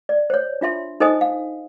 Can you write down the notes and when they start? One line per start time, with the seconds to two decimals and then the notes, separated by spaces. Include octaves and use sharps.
0.09 D5
0.30 C5 C#5
0.61 D4 F4 E5 C6
1.00 D#4 A4 C5 D#5 G#5 D#6
1.21 F5